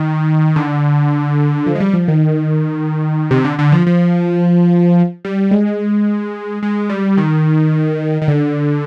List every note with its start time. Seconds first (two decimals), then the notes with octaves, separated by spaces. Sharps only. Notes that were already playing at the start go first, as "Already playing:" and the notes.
Already playing: D#3
0.56 D3
1.66 F3
1.75 G#3
1.80 G3
1.94 F3
2.08 D#3
3.31 C3
3.45 D3
3.59 D3
3.72 F3
3.87 F3
5.25 G3
5.51 G#3
6.63 G#3
6.90 G3
7.17 D#3
8.22 D#3
8.28 D3